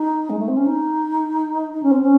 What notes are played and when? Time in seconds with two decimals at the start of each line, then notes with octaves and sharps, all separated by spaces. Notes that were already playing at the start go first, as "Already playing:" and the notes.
Already playing: D#4
0.29 G#3
0.39 A3
0.48 C4
0.56 C#4
0.66 D#4
1.73 D#4
1.83 C#4
1.91 C4
2.02 C#4